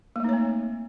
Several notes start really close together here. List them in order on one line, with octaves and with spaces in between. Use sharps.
A#3 A3 D#4 C#5 C4